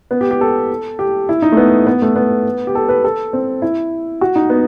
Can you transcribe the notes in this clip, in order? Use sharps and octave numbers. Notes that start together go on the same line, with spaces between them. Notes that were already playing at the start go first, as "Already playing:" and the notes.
B3
G4
G4
A4
G4
E4
D#4
A3
B3
B3
A3
B3
G4
A4
B4
A4
C4
E4
F#4
D#4
B3